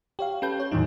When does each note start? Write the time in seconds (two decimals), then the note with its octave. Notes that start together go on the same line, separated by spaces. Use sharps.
0.19 G4 C#5 F5
0.42 C#4 G4 A4 B4 G6
0.60 C#5
0.72 E2 A2 D#3 E3 F#3 D#4